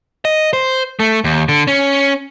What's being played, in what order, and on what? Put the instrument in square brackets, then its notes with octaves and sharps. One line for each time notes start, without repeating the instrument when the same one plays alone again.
[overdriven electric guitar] D#5
C5
A3
D#2
D3
C#4